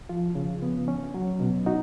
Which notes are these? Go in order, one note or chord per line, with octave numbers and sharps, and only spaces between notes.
F3 F4
C#3
B3
C#4
F#3
B2
D#4 F#4